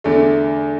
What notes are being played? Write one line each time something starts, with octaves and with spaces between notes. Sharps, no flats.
E2 D3 A3